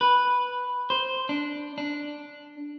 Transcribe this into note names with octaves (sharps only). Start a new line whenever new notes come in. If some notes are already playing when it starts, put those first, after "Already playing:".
B4
C5
D4
D4